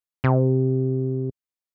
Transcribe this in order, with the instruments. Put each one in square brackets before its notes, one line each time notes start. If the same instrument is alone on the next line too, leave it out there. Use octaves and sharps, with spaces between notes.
[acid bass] C3